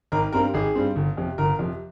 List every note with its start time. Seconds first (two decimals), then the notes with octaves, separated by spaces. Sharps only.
0.12 G#1 A#4
0.32 G2 G3 C4 A#4
0.54 G#1 G#4
0.75 G2 G3 C4
0.96 G1
1.17 F2 C3
1.38 G1 A#4
1.59 F2 C3